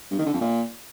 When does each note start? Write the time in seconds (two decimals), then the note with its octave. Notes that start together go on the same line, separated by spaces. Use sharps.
0.11 G2
0.18 D#3
0.26 D3
0.33 F2
0.41 A#2